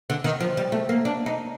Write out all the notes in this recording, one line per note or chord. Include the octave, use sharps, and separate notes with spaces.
D3
D#3
F3
G3
A3
A#3
D4
D#4